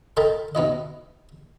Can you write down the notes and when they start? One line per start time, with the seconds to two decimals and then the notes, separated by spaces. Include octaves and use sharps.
0.17 A4 A#4 D#5 G5 A5 B5
0.55 B2 D#4 E4 D#5